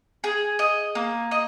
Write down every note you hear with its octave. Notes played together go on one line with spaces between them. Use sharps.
G#4
D#5
A#3
D#5